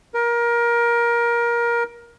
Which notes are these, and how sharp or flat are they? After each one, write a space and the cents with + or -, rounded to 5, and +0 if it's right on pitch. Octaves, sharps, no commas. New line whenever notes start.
A#4 +20